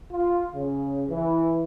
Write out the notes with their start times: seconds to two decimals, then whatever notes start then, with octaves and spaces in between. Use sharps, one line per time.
0.12 F4
0.54 C#3
1.09 E3